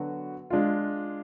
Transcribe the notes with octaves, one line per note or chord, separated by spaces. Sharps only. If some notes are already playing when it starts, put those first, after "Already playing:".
Already playing: D3 F#3 B3 F#4
G#3 D4 F4